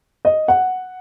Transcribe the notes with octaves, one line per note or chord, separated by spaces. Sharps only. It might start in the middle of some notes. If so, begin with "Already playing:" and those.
D#5
F#5